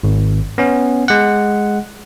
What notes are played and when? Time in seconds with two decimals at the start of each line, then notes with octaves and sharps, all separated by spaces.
0.03 G#1
0.58 B3 C#4
1.08 G#3 F#5